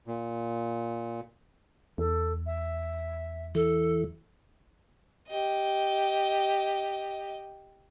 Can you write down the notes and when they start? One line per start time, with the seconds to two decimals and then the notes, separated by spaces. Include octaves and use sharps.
0.07 A#2
1.98 E2 A4
2.46 E5
3.55 E3 A4
5.28 G4 D#5